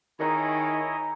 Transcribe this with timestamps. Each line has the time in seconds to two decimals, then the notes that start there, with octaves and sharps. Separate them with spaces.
0.19 D#3 D#4 E4 G#4 C#5 D#5